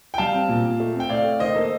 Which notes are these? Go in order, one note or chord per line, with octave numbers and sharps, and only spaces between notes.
G5
G3 F5 A5
C4
A#2
A#2
A3
C4
G5
A2 D5 F5
A3
D#3 C5 D#5
A#3 A4 C5